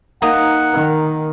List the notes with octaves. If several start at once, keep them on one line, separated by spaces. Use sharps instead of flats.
A#3 D#4 F#5 A#5 D#6
D#3